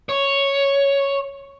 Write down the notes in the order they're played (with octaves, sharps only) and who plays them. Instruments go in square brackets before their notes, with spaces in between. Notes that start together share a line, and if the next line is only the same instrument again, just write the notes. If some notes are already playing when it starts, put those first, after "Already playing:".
[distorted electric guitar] C#5